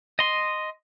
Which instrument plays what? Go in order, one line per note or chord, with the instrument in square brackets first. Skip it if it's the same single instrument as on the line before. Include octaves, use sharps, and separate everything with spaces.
[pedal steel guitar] D#5 C6